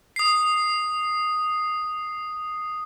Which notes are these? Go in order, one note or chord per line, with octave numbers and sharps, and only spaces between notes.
D#6 C7